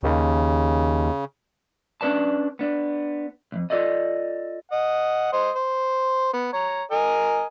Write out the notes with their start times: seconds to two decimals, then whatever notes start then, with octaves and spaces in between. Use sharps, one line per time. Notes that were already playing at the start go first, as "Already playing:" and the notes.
0.03 D#2 C#3
2.01 C#4 D4 A#4 B4 D5 A5
2.59 B3 D4
3.52 C2 F2
3.70 F4 G4 A4 D5 D#5
4.72 D#5 F#5
5.33 C5 D#5
5.56 C5
6.34 B3
6.53 C#5 A#5
6.91 A#4 D#5 G#5